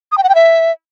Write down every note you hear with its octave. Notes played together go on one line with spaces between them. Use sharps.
D#6
G5
F#5
G5
E5